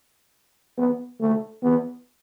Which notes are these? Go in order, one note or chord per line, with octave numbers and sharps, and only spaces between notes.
B3
A3
B3